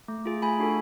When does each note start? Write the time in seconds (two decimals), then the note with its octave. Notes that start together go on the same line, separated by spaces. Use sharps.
0.08 A3
0.26 F4 G#4
0.42 A3 G#5 B5
0.59 D4 F#4 A4